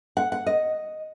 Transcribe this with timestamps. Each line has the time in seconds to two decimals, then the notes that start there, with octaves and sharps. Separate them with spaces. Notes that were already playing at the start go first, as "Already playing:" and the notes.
0.17 F#5
0.32 F#5
0.46 D#5